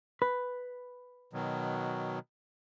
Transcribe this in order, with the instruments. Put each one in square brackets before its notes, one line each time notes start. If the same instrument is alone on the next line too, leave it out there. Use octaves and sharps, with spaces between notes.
[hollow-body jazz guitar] B4
[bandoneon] B2 D#3 F#3